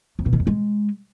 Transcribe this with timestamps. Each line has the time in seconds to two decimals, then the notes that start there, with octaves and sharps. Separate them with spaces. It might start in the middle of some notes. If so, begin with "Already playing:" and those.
0.19 F2
0.26 B2
0.33 D#3
0.40 F2
0.47 G#3